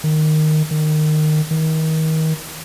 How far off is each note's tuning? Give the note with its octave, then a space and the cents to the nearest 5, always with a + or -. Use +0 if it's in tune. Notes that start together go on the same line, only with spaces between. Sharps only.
D#3 -10
D#3 -20
D#3 +30